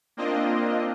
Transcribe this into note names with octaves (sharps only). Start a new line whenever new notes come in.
A#3 C4 D4 F4 D#5